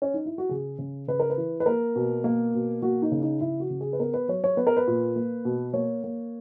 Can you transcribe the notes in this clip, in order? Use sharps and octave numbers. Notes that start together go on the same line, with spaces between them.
C#4
D#4
E4
F#4
C#3 G#4
C#3
C#3 B4
A#4
B4
E3
B4
A#3 A#4
B2
A#3
B2
A#3 F#4
D#4
C#3
D#4
C#3 E4
F#4
C#3
G#4
B4
B3 A#4
B4
F#3 C#5
C#5
B3 B4
A#4
B4
A#2
A#3
B2
A#3 C#5
A#3